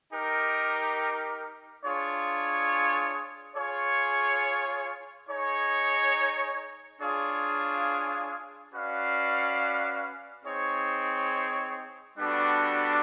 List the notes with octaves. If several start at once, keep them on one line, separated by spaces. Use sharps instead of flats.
D#4 G4 A#4
D4 F4 G#4 C#5
F4 G#4 C#5
D#4 G#4 C#5
D4 F4 G#4 C#5 F5
C#4 F#4 B4 D5 F5
C4 D#4 G#4 C#5
G3 B3 D4 F#4 A4